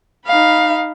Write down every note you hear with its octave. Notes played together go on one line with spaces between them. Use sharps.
D#4 F5 B5